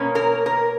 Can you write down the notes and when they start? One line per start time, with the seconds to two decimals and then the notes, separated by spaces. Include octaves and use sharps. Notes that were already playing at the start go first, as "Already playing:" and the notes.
Already playing: B2 A#3 C#4
0.15 A#4
0.46 A#4